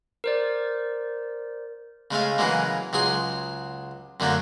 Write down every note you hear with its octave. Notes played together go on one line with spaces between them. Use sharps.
A#4 C5 D5
C#3 G#3 A3 F5
C#3 E3 F#3 G#3 A#3
C#2 F#3 G#4 C6
F#2 D3 F#3 A3 A#3